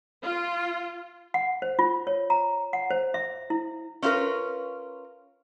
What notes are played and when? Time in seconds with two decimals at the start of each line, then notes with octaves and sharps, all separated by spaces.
0.22 F4
1.34 F#5
1.62 C5
1.79 F4
2.07 C#5
2.30 A#5
2.73 F#5
2.91 C5
3.14 E5
3.50 E4
4.02 C#4 D#4 F4 F#4 A#4 B4